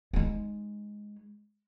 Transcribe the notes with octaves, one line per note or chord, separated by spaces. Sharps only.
G#3 D#4